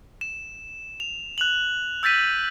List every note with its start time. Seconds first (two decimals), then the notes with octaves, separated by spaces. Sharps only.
0.21 E7
1.00 F7
1.38 F#6 F7 F#7
2.03 E6 G6 A6 B6 D#7